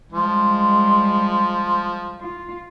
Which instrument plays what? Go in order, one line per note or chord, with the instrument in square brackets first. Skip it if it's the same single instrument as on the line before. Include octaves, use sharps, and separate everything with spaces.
[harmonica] F3 [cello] G3 G#3 [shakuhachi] C6
[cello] F4